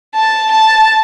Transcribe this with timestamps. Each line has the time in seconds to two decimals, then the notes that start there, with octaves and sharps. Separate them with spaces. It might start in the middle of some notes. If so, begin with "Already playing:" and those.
0.15 A5
0.51 A5